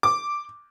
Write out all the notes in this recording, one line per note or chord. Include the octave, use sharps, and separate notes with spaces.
D6